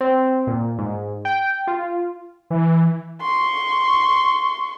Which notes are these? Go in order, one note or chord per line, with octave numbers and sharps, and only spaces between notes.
C4
A#2
G#2
G5
F4
E3
C6 C#6